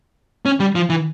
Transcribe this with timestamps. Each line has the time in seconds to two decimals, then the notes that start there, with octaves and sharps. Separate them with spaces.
0.45 C#4
0.60 G3
0.75 F3
0.90 E3